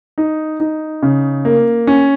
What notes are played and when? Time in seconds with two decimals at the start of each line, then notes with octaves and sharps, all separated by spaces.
0.18 D#4
0.60 D#4
1.03 C#3
1.45 A#3
1.87 C#4